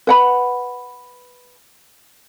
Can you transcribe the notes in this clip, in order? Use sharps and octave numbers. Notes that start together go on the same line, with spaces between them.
B4 F#5 B5